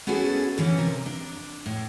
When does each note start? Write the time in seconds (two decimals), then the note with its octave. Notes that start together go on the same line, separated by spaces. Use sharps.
0.07 B3 C#4 E4 F#4 G#4 A4
0.58 D3 E3 C#4
0.78 C3 A#4
1.06 D4
1.66 A2